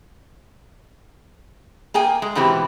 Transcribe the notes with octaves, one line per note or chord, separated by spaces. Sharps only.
A#3 G#4 G5 G#5
G#3
G#2 B2 E3 C4 G4